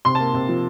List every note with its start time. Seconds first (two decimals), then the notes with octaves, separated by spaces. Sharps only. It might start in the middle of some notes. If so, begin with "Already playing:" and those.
0.05 C3 C6
0.15 A#3 A5
0.34 C3
0.48 F3